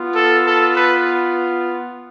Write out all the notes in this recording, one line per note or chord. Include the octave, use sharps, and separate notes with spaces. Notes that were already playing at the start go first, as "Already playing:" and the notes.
Already playing: B3 F4
A4
A4
B4